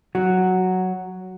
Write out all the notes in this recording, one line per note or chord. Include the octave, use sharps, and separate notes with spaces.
F#3 F#4